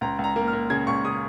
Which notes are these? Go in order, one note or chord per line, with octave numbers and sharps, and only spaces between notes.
C#2 A#5
C#2
A#5
A#3
F6
A#3
C#3 G#6
C#2 C#6
C#3 D#6